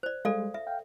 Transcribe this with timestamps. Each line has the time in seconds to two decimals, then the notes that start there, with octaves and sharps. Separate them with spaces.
0.03 C5 D5
0.25 G3 G#3 A4 D5 F5
0.54 E5
0.67 F5 G5